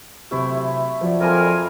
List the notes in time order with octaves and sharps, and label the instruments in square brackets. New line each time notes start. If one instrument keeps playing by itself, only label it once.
[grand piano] C3 F#3 [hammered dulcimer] A3 E4
[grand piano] F3 F#4 D5
[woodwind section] F2 A#4 G#5 [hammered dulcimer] G3 F4 G#4